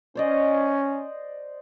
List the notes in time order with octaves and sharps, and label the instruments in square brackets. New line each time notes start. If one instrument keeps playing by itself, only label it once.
[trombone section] C#4 [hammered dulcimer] C5 D5 D#5